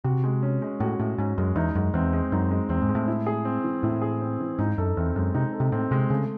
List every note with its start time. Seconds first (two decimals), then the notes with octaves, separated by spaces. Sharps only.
0.04 C3 F#4
0.24 G#3
0.43 C#4
0.62 G#3
0.80 A2 F#4
0.99 A2 G#3
1.18 G#2 C#4
1.38 F#2 G#3
1.56 E2 D#4
1.75 F#2 G#3
1.94 E2 C4
2.13 G#3
2.32 F#2 D#4
2.51 G#3
2.69 E2 C4
2.82 G#2
2.89 G#3
2.95 A2
3.08 E4
3.26 G#4
3.45 C4
3.64 E3
3.83 A2 E4
4.01 G#4
4.21 C4
4.40 E3
4.59 G#2 D#4
4.78 F#2 A4
4.97 E2 C4
5.15 F#2 G#3
5.34 C3 D#4
5.53 A4
5.60 C3
5.72 A2 C4
5.91 C3 G#3
6.10 C#3 A3